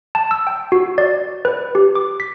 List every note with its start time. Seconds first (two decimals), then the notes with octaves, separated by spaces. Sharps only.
0.15 A5
0.31 E6
0.47 G5
0.72 F#4
0.98 D5
1.45 B4
1.75 G4
1.95 D6
2.20 B6